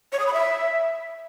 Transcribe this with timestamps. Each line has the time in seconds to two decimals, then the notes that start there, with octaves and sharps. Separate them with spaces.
0.13 C#5
0.19 D#6
0.26 B5
0.33 E5